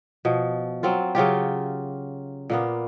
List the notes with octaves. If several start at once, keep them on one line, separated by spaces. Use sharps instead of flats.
B2 F3
F#3 C4 F4
C#3 F#3 F4 G4
A#2 A#3 B3